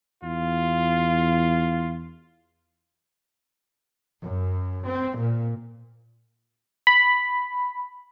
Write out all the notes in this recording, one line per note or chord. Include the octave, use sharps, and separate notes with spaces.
E2 F4
F#2
C4
A#2
B5